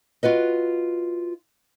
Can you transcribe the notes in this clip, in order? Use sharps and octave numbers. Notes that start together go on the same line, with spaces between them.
F4 F#4 B4 D#5